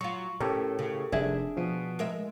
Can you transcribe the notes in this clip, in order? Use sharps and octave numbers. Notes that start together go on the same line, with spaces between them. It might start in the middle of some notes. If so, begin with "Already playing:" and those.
F#3 F4 C#6
A2 C#4 G4 A4 A#4
C#3
F1 D4 G#4 E5
B2 F3
G#3 A#4 E5